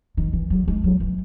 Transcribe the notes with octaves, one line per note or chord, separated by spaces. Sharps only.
D#3
E3
F#3
G#3
F#3
E3